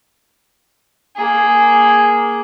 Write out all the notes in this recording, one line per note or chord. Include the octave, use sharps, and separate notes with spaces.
A#3 G#4